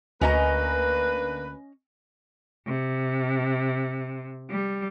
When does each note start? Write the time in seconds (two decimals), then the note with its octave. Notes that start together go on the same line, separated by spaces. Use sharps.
0.21 D2 A#3 C#4 D4 B4 D#5 A#5
2.66 C3
4.49 G3